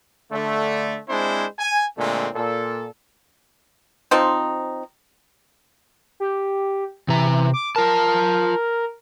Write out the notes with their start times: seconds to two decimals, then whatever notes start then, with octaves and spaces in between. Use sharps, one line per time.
0.31 D3 A3
1.08 G#3 C4 D4 E4 C5
1.59 G#5
1.98 A#2 D3 G#3 A3 C4
2.34 A#2 A4
4.11 F3 C4 D#4
6.20 G4
7.08 C3 E3 A#5
7.54 D6
7.76 F4 A#4 A5